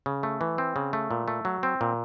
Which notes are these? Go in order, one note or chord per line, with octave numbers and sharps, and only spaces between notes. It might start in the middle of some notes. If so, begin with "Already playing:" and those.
C#3
A3
E3
C4
C#3
A3
A#2
A3
F#3
C4
A#2